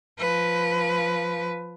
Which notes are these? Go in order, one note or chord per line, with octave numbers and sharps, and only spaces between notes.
F3 B4